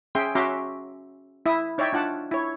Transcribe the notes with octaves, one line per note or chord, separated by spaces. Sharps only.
C#4 G#4 E5 G5 C6
C#4 F#4 E5 A#5 C6 D6
E4 E5 D#6
D#4 C#5 D5 E5 G5
D4 F4 F#5 A5
E4 C#5